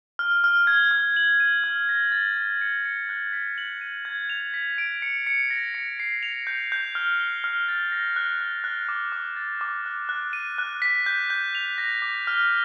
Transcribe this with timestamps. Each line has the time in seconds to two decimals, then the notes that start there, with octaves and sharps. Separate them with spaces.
0.19 F6
0.44 F6
0.67 G#6
0.91 F6
1.16 F#7
1.40 D#7
1.64 F6
1.89 A#6
2.12 A6
2.37 A6
2.61 C#7
2.85 C#7
3.09 F#6
3.33 B6
3.58 F#7
3.81 D#7
4.05 G#6
4.30 F7
4.54 B6
4.78 D7
5.02 C#7
5.27 C#7
5.51 A#6
5.74 C#7
6.00 C7
6.23 F7
6.47 G6
6.72 G6
6.95 F6
7.20 G7
7.44 F6
7.69 A6
7.92 A#6
8.16 F#6
8.41 F#6
8.64 F#6
8.89 D6
9.12 D6
9.36 A6
9.61 D6
9.86 F#6
10.09 F#6
10.33 D#7
10.58 F#6
10.82 B6
11.06 G6
11.30 G6
11.55 F7
11.78 A#6
12.02 D6
12.27 F6